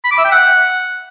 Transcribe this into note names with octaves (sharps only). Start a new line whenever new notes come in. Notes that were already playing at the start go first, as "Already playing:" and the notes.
B5
D6
E5
G5
F#5